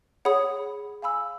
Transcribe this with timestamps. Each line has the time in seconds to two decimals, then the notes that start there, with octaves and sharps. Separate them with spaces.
0.25 G#4 C#5 F#5 B5 D#6
1.02 F5 G#5 B5 E6